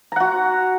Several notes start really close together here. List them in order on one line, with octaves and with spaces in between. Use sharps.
A#5 F#5 F#4